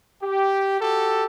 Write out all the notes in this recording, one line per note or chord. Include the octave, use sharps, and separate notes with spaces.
G4
F#4 G4 A4